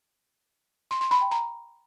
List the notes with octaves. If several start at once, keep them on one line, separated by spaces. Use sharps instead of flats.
C6
C6
B5
G5
A#5